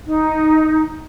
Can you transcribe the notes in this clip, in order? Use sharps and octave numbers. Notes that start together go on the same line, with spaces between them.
D#4